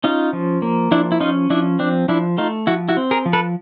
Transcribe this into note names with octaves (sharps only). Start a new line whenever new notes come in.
C#4 D#4 F4
F3
A#3
F3 D4 E4
E4
C#4 D#4 F4
F3 D4 E4
C4 D4
F3 D4 E4
A3 D#4 F4
F3 E4 F#4
E4 F#4
C4
G#4 A#4
F3
A4 B4